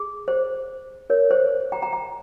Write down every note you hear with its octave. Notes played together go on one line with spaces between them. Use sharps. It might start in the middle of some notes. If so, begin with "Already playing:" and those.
Already playing: G#4
C5
A#4 C#5
C5
G5 A#5
G5 A#5
G5 A#5